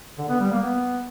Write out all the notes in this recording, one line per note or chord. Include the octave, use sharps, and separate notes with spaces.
D3
B3
G3
A#3
B3